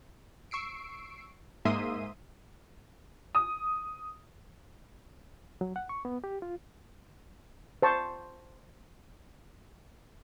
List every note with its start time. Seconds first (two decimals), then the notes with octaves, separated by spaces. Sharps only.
0.51 C#6 E6 C7 D7
1.65 G#2 A#3 E5 C6 D#6 D#7
3.35 D#6
5.61 F#3
5.76 F#5
5.89 C#6
6.05 B3
6.24 G4
6.42 F4
7.82 C5 A5 C#6